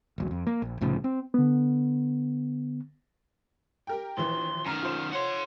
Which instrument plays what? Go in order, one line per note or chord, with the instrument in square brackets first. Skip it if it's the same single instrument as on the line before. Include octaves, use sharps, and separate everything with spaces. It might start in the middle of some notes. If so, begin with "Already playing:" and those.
[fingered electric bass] D#1 A#1 F#3
F2
A#3
A#1
C2 A2 C#3 F3
C4
[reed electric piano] D3 B3
[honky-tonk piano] G4 A#4 G5
[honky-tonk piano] A#1 D#2 E3 [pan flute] C6
[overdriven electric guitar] F#2 D#3 [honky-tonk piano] A#5 [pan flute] F6
[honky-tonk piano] F4 C5 E7
[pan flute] C#5 [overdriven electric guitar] F#5 C6